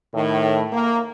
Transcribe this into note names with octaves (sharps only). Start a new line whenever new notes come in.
A2 D#3
A#3